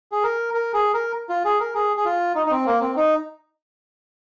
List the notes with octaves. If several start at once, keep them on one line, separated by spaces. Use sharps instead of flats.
G#4
A#4
A#4
G#4
A#4
F4
G#4
A#4
G#4
G#4
F4
D#4
D#4
C4
A#3
C4
D#4